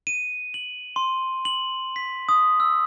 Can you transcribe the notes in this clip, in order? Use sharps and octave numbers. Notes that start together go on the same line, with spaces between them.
D#7
F#7
C6
F#7
B6
D#6
E6